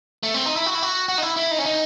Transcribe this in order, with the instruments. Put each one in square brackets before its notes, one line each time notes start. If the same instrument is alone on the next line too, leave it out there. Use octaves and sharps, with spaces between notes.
[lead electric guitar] A3
C4
D#4
E4
F#4
E4
F#4
F#4
D#4
E4
E4
D#4
C#4
D#4